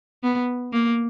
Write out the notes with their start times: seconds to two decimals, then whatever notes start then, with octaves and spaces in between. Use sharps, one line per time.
0.23 B3
0.73 A#3